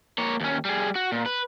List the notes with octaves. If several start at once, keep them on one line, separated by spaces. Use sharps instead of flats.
A#3 C#5
D#2 C#4
G3 G#4
F#4
A#2
B4